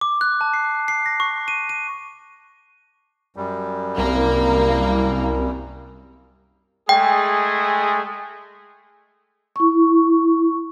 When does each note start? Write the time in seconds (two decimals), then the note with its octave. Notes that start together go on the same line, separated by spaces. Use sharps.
0.01 D6
0.21 F#6
0.41 A5
0.54 C7
0.88 C7
1.06 A#6
1.20 C#6
1.48 D#7
1.69 D#7
3.36 F#2 G3
3.98 C2 A#3
6.89 G#3 A3 G#4 G5
9.56 E4 C#6